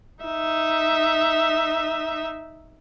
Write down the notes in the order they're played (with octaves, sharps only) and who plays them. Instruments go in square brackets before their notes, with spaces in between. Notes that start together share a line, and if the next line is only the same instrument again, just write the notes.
[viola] D#4 E5